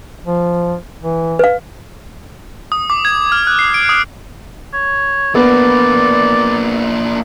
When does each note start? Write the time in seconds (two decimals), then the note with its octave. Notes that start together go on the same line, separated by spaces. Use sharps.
0.25 F3
1.02 E3
1.39 B4 F5
2.72 D#6
2.90 D6
3.05 G#6
3.32 F6
3.47 F#6
3.59 C7
3.74 D7
3.89 D#6
4.73 C#5
5.35 A#3 B3 D4 D5